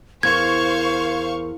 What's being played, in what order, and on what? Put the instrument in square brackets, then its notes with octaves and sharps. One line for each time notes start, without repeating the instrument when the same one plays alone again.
[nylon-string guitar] E2 [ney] A#4 [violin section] C5 F5 C#6 [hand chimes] G#6